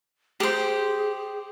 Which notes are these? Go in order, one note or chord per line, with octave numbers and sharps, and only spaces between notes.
G4 G#4 C5